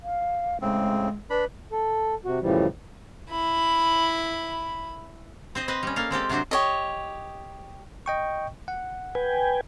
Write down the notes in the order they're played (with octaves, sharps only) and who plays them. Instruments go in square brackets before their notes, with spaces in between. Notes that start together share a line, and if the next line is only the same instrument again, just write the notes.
[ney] F5
[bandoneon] A2 C#3 C4 [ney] G#3
[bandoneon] D4 B5 [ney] B4
[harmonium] A4
C3 F#4
F#2 A2 C#3 E3 F3 G3
[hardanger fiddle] E4 B5
[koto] C4 C5 D#5
C4 B4 D#5
G3 C#4
A#3 A4 F5
G#3 C4 G4 A4
C3 F#3 D4 F#4 C5
[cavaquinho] G4 C#5 D#5
[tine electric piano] D#5 G5 C#6
F#5
[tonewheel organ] B4 G5 G#5